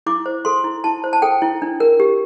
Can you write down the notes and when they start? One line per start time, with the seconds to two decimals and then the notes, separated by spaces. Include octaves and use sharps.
0.06 E4 D6
0.26 C5
0.45 A4 C6
0.64 E4
0.84 E4 A5
1.04 C5
1.13 A5
1.22 A4 G5
1.42 E4
1.62 D4
1.80 A#4
2.00 G4